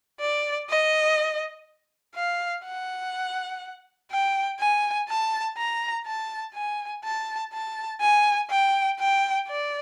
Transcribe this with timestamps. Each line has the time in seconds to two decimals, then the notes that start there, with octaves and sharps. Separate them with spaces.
0.20 D5
0.70 D#5
2.15 F5
2.65 F#5
4.11 G5
4.60 G#5
5.09 A5
5.57 A#5
6.06 A5
6.54 G#5
7.04 A5
7.53 A5
8.01 G#5
8.50 G5
8.99 G5
9.48 D5